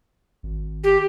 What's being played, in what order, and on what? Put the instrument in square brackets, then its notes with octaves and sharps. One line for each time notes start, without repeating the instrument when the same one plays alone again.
[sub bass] G#1
[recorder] G4